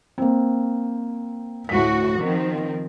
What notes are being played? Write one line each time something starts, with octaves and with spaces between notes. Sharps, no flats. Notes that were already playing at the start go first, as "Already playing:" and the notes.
A#3 C4
D2 A2 F#4 B6
D#3 F3 C4